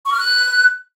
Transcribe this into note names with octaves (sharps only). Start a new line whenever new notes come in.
C#6
F6
F#6